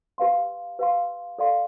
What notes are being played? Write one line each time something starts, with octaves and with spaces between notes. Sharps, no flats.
G4 B4 F5 C6
G4 B4 F5 C6
A4 D5 F5 C6